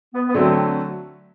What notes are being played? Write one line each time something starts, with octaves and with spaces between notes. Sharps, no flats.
B3
B3
D3 F#3 A3 C4